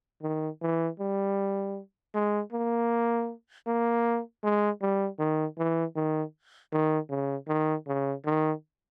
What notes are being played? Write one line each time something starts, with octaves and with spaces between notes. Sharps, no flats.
D#3
E3
G3
G#3
A#3
A#3
G#3
G3
D#3
E3
D#3
D#3
C#3
D#3
C#3
D#3